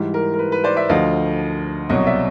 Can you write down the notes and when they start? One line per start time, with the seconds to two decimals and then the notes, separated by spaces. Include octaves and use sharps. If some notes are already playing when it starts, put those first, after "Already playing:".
Already playing: G#2 E3 G3
0.14 A#4
0.34 A#4
0.39 B4
0.52 B4
0.64 C5 D5
0.76 D5 E5
0.89 D2 D3 F3 D#5 F5
1.89 C2 B2 F#3 C#5 D#5
2.07 D5 E5